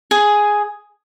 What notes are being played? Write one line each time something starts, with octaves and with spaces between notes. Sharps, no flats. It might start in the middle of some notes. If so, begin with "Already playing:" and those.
G#4